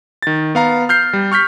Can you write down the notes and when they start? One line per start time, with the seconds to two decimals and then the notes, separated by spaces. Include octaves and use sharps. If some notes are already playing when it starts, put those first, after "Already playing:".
0.22 D#3 A6
0.55 B3 F5 A#5
0.89 F6 G6 C7
1.13 G3
1.32 C#6 F6 G6 B6